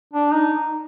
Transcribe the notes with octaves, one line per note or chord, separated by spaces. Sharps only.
D4
D#4